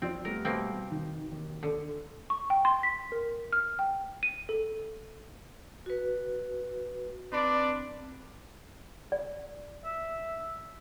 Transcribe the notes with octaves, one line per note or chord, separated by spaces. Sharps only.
F2 C4 F4 D5
G3 A3 B3 A#4
B2 A#3 C4
D#3
D#2
D3
C#6
G5
C6
B6
A#4
F6
G5
D#7
A4
F#4 B4
C4 D4 B4 D5
D5
E5